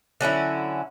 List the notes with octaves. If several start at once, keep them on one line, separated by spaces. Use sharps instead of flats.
D3 F#3 C#4 E4